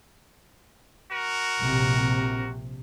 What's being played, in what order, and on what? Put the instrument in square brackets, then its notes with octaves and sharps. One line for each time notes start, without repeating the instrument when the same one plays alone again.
[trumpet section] F#4 A#4
[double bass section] A#1 C3